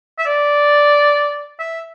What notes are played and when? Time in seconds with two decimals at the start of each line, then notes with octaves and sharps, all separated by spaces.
0.19 E5
0.26 D5
1.60 E5